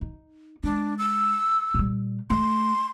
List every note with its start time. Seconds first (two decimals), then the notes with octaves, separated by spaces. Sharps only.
0.01 D#4
0.64 G#3 D4
0.98 E6
1.74 A#2 G3
2.30 A3 C6